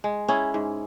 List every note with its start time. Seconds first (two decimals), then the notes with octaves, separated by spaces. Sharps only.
0.04 G#3
0.28 C#4 E4 G#4
0.54 G#2